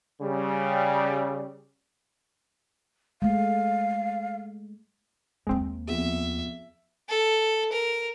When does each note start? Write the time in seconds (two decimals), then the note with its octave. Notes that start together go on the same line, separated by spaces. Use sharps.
0.21 C#3 G3
3.22 G#3 A3 F5
5.47 D#2 G#3 A#3 C4
5.88 F2 B3 G#4 E5
7.09 A4
7.72 A#4